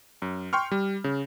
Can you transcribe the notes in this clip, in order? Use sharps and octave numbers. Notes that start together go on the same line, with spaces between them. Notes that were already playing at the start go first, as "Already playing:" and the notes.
F#2
G5 C6 C#6 F6
G3
C#3